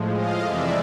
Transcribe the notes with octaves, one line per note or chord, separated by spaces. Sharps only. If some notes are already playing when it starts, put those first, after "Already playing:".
Already playing: A2 F3 G#3
D#5 F5
F2 C3 E3 G#3 D5 E5